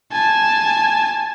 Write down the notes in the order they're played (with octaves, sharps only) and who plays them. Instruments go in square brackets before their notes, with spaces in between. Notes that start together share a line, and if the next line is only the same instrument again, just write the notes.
[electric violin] G#5 A5